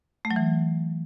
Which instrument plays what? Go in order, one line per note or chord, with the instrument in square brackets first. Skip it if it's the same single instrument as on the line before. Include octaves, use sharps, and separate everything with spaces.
[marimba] A3
F#3
E3